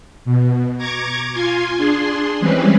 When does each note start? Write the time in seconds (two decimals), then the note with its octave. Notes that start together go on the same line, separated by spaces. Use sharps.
0.25 B2
0.78 A#5 C#6 D6 G#6
1.33 F4 G#5 C6
1.77 D4 G#4 C6
2.40 E3 G3 G#3 C4 C#4 B4